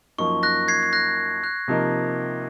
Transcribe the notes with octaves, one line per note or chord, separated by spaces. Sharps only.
F#2 F3 A#3 D#4 C#6
F#6 A#6
G#6 C7
C7
F#6 A#6
F#6
C3 F3 A#3 D#4 A#4